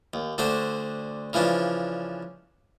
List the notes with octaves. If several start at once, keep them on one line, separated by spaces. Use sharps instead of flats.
D#2
D2 D3 D4 C5 C6
C#3 E3 F3 D4